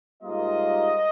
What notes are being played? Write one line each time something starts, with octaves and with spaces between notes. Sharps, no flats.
G#2 G3 A#3 F4 D#5